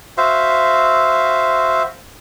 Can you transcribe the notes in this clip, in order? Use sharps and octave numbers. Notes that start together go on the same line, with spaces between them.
F#4 C5 E5 F5